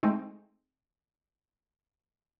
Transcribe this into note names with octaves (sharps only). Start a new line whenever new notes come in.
G#3 A3 C4 D#4